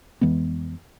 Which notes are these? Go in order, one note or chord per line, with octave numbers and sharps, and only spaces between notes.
F2 E3 G#3 B3